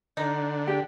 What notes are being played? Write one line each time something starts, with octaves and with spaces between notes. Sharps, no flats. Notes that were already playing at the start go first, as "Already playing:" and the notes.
D3 D#4
G4 G5